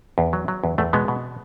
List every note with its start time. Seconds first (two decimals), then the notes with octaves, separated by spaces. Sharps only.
0.18 E2
0.33 F#3
0.48 F#3
0.64 E2
0.78 E2 A3
0.93 B2 G#3 B3
1.08 B2